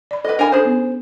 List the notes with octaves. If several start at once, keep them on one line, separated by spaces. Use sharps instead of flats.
D5 B5
A4 B4 D#5 F#5
D4 A#4 G#5 B5
C#4 D4 G#4 A4 C5
B3